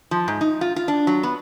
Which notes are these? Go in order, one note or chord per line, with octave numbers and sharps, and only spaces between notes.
F3
G#2
D#4
F4
F4
D4
F#3
B3